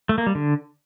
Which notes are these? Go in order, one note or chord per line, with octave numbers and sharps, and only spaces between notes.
A3
A#3
G3
D3